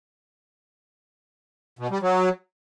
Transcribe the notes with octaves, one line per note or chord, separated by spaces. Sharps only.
B2
G3
F#3